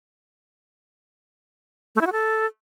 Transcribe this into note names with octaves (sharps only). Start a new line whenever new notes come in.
A3
E4
F#4
A4